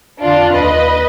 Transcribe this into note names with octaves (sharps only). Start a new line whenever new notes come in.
F2 D3 D4 F4
D#2 D3 B4 D#5